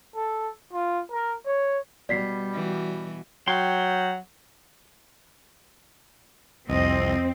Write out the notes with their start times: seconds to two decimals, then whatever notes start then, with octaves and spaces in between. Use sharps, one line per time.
0.15 A4
0.73 F4
1.12 A#4
1.46 C#5
2.09 B2 G3 D5 B6 C7
2.54 E3 F#4
3.48 F#3 G5 C6
6.69 C2 F2 C4 D#5